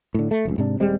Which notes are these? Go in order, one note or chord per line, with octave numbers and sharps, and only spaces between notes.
A2 D3
A3
F1 C#2
G#2 C3 D4
D#1 G3 G#3 C4